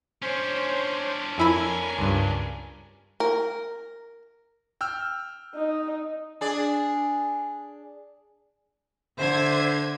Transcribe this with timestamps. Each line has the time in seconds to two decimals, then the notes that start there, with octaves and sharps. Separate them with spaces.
0.22 C#4 D4 C5 C#5
1.38 F2 E4 A#4 G#5 B5
1.98 C#2 G2
3.20 A#4
4.81 G5 E6 F6
5.55 D#4
6.41 D4 G#4 D5
9.18 D3 C5 E5 G#6